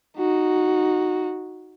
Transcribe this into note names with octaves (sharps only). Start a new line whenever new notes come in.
D#4 F#4